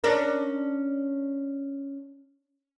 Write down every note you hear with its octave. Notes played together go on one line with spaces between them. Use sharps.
C#4 D4 A#4